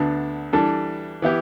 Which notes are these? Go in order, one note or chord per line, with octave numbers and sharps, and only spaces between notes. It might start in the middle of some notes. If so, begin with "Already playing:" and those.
Already playing: D2 D3 B3 D4
E3 G3 D4 A4
E3 B3 E4 G4